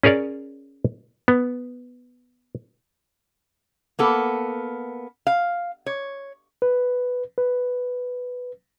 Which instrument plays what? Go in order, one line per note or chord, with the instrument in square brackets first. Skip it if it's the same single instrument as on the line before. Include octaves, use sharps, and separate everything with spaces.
[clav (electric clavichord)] C#4 G#4 A#4 C#5 D5
B3
[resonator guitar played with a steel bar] A#3 B3 A4
F5
C#5
[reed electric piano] B4
B4